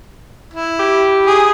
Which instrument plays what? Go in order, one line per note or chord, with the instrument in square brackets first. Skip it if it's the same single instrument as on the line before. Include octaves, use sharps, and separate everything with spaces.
[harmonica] E4
[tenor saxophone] G4
[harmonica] G#4